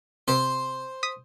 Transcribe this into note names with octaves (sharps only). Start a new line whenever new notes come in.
C3 C5
D#6 B6 D#7